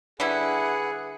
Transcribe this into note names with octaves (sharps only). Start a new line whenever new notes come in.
D3 G3 E4 G#4 B4 F#5